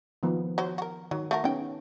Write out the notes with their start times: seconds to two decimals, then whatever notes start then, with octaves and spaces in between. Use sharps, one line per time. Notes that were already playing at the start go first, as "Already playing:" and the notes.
0.23 D#3 F3 B3
0.58 F#3 C5
0.78 F#4 A#4
1.11 D#3 F#3
1.31 A3 F#4 A#4
1.44 C#3 B3 C#4 D#4 G5